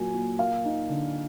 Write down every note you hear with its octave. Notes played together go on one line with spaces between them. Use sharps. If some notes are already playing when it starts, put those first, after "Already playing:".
Already playing: A#2 F#3 A#3 G#5
A#2
A#3 F5
D#4
D3